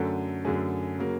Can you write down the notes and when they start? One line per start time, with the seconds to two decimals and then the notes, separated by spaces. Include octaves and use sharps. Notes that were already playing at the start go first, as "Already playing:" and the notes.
Already playing: F#2 D3 F#3 A3 A4
0.45 F#2 D3 F#3 A3 G#4
0.98 C#3 F#3 A#3